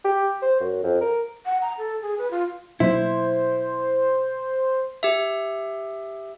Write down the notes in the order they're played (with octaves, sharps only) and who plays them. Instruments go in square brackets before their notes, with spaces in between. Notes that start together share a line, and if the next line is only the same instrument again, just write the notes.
[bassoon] G4
C5
F#2
F2
A#4
[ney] F#5
A#5
A4
G#4
B4
F4
[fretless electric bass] B2 F#3 A#3 [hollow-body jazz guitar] E4 [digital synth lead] C5
[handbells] G4 E5